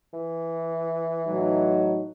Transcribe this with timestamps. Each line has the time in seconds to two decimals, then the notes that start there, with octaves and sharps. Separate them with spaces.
0.13 E3
1.27 A2 F#3 D#4